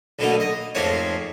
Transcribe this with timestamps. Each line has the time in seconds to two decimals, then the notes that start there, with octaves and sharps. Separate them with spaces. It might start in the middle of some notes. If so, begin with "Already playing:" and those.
0.19 B1 B2 D3 F#3 A3 A#3
0.40 D#5
0.75 F2 G#2 A3 A#3 C4 C#5